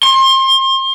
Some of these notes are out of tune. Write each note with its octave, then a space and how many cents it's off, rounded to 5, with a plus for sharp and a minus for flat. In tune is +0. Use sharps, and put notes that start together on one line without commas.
C6 +30